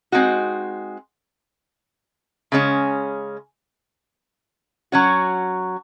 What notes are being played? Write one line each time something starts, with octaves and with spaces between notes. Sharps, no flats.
G#3 C4 D#4 F#4
C#3 G#3 C#4
F#3 C#4 F#4